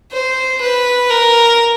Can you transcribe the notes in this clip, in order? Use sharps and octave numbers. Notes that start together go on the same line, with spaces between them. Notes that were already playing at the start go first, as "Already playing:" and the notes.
C5
B4
A#4